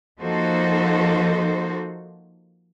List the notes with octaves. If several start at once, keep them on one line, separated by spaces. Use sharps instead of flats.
F3 A#3 D#4 F#4 A4 C5